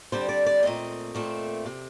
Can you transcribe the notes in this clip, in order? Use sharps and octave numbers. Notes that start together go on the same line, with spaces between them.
D3 G3 C4 C5
D5
D5
A#2 A3 C4 D#5
A#2 A3 C4
C3